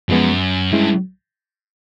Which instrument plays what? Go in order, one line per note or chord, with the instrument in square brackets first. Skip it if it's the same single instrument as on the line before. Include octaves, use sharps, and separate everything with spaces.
[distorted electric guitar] F#2 [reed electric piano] F3 G#3 B3
[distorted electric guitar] G2 [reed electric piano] G#3 C#4 E4